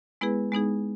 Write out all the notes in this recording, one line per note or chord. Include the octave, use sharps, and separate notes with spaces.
G#3 B3 E4 G#4 B4
G#3 B3 D#4 G#4